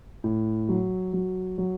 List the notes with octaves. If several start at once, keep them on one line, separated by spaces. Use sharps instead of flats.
A2
F#3
F#3
F#3